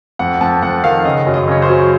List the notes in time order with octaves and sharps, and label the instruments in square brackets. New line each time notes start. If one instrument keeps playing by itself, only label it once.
[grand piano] F2 F#5
F2 A5
F2 F#5
D#3 F5
C#3 D#5
F#2
D#5
C#3 C#5
C5
F#3